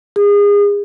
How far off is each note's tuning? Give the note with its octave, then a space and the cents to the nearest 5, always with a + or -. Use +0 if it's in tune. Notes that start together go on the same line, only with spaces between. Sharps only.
G#4 -30